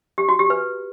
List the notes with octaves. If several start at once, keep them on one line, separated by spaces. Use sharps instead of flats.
G4
F#4
G4
B4